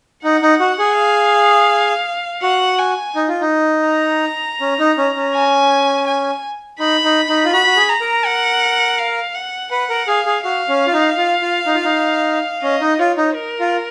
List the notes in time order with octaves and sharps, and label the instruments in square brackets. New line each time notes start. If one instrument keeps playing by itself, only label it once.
[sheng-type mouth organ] D#4 [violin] F#5
[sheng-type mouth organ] D#4
F#4
G#4
[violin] F5
[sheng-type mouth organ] F#4 [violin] F#5
[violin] G#5
[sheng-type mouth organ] D#4
F4
D#4
[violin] A#5
[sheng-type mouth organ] C#4
D#4
C#4
C#4
[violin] G#5
G#5
[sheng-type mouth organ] D#4 [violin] B5
[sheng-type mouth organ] D#4
D#4
F4
[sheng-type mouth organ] F#4 [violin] B5
[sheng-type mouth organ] F#4
G#4
[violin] A#5
[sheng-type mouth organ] A#4
[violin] F#5
F5
F#5
[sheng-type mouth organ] B4 [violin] F#5
[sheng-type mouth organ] A#4
[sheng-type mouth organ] G#4 [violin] F5
[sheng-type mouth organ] G#4
[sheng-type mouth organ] F#4 [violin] F5
[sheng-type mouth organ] C#4
F4
D#4
F4
F4
D#4
F4
D#4
[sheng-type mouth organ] C#4 [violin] D#5
[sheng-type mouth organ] D#4
[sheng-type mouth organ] F4 [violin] C#5
[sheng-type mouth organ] D#4
[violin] A#4
[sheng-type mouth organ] F4